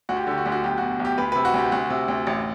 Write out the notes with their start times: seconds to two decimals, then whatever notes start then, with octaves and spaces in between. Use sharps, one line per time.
0.09 D2 F#4
0.16 G4
0.24 F#4
0.27 D3 G4
0.38 F#4
0.45 D2 G4
0.52 F#4
0.63 B1 G4
0.78 B2 F#4
1.00 B1
1.05 G4
1.18 D2 B4
1.32 C3 B4
1.45 F#4
1.54 D2 G4
1.72 D2 F#4
1.90 C3
2.08 D2
2.27 A1